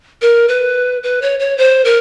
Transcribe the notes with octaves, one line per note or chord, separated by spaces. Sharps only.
A#4
B4
B4
C#5
C#5
C5
A#4